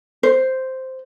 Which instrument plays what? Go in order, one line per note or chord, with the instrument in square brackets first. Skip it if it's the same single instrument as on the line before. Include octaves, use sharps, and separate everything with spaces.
[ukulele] C5